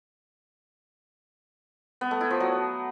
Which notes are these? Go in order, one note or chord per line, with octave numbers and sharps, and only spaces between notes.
B3
A3
E4
F3
F#3